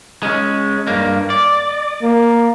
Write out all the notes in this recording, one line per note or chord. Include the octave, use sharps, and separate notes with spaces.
G#3 C#4
G2 A#3
D5
A#3